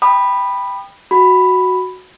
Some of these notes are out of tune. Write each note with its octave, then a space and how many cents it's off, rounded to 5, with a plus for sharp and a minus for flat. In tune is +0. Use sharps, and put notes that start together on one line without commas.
G5 +10 B5 +0 D#6 -35
F#4 +0 B5 +5